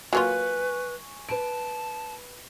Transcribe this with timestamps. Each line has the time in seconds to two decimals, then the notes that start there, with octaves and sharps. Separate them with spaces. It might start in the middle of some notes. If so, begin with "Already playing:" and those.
0.13 F#3 A#3 F4 B4 G#5 C#6
1.29 B4 A5 D7